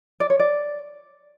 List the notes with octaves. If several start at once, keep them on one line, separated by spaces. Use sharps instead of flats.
D5
C#5
D5